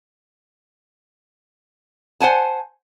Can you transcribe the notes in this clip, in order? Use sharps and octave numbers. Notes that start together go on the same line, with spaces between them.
C5 F#5 G#5 A5